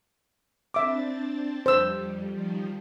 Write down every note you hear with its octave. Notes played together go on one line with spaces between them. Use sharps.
C4 D4 E5 D6 A6
F2 G3 C5 E6
D#3 F3 G3